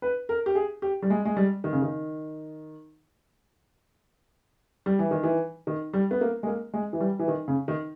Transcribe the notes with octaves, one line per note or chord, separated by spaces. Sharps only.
B4
A#4
G4
G#4
G4
G3
G#3
G#3
G3
D#3
C#3
D#3
G3
E3
D#3
E3
D#3
G3
B3
A#3
G#3
A#3
G#3
E3
G3
E3
D#3
C#3
D#3